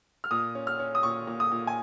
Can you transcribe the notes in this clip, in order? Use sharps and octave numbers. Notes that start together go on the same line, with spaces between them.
F6
A#2 D#6
C#4
F6
C#4
D#6
A#2 C#6
A#2
D#6
A#2
G#5